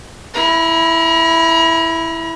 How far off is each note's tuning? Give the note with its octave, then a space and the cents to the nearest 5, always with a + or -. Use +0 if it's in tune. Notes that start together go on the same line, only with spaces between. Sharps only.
E4 +0 A#5 +40